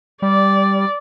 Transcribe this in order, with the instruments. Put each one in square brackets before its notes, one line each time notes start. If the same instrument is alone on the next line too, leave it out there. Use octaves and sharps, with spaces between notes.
[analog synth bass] G3 [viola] D5